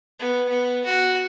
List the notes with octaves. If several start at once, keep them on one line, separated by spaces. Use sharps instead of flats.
B3
B3
F#4